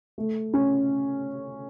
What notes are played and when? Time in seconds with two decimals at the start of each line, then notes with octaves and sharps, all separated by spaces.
0.18 A3
0.53 C#4